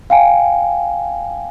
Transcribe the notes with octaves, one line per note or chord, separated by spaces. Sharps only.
F5 G5 G#5